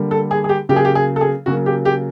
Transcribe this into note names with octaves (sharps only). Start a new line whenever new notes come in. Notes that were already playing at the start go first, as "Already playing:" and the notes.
Already playing: D3 G3 A#3
A4
G#4
G#4
G4
C#3 F#3 A#3 G4
G#4
G4
G#4
A4
G#4
C#3 F#3 A#3 F#4
G4
G4